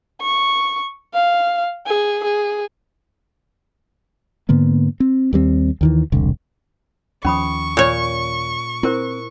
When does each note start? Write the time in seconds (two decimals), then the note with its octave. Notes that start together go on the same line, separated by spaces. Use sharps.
0.21 C#6
1.14 F5
1.86 G#4
2.24 G#4
4.49 G#2 D3 A#3 B3
5.00 C4
5.33 D#2 G3 A#3 C4
5.81 D#2 D#3 E3
6.12 E1 C2 D3
7.25 D#2 F3 C#4 B5 C#6 D#6
7.77 A#2 C#5
8.83 C4 E4 A#4 C5